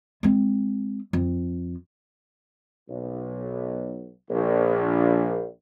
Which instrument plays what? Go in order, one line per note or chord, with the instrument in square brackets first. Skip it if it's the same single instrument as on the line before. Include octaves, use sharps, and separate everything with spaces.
[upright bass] G#3 C4
F2
[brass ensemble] B1
A#1